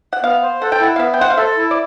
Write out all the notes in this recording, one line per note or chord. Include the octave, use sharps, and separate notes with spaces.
F#5
B3 F5
C5
A4 F#5
G5
E4 F#5
F5
B3 E5
G5
C5 F#5
F5
A4 E5
E4
D5